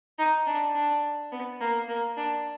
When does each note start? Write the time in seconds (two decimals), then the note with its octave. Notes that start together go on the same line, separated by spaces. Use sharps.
0.19 D#4
0.47 D4
0.75 D4
1.32 B3
1.60 A#3
1.88 A#3
2.17 D4